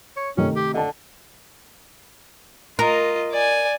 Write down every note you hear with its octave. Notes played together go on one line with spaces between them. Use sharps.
C#5
C3 D#3 A3 C#4
G4
D3 D#5 A5
F4 A#4 D#5
D5 G#5